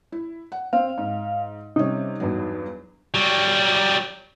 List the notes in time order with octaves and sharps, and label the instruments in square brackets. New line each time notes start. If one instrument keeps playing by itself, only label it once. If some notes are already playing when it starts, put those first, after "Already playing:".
[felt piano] E4
F#5
[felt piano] C4 [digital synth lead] F5
[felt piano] G#2
[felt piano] C3 G3 C#4 [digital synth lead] D#4
[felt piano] E2 G2 F#3
[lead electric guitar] F#3 G3